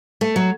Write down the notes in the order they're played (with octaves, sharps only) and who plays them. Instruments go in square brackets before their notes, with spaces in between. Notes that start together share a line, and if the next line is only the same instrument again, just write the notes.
[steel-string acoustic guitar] A3
F#3